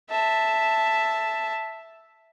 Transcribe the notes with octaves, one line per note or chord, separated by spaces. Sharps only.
E5 A5